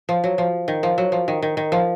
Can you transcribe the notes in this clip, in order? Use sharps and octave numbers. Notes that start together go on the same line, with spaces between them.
F3
F#3
F3
D#3
F3
F#3
F3
D#3
D#3
D#3
F3